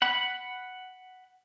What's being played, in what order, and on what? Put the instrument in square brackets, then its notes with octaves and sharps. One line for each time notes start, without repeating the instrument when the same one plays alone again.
[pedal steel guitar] F#5 B5